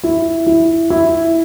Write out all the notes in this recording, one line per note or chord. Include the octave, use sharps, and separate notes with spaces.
E4
E4
E4